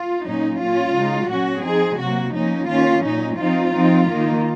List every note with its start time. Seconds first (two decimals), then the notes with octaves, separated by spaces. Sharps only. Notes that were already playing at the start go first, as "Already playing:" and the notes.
Already playing: F4
0.25 A#2 F#3 C#4 D#4
0.59 A#2 F#3 C#4 F4
0.95 C#3 G#3 D#4
1.29 A#2 F#3 C#4 F#4
1.63 F3 C4 D#4 G#4
1.98 C3 F#3 A#3 F#4
2.33 F3 A#3 C#4 D#4
2.68 D#3 A#3 C#4 F4
3.03 A#2 F#3 C#4 D#4
3.38 F3 C4 D#4 F4
3.72 F3 C4 D#4
4.07 D#3 A#3 D#4